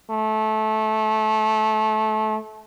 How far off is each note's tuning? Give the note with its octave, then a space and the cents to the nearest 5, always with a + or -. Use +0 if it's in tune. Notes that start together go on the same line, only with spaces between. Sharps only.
A3 -20